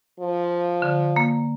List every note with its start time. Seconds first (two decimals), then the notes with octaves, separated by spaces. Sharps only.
0.20 F3
0.82 D3
1.16 A#3